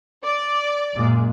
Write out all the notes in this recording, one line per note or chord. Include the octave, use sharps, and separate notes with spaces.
D5
F#2 A#2 G#3